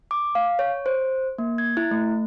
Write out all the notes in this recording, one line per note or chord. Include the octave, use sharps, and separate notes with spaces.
D6
F5
C#5
C5
A#3
G#6
E4
A3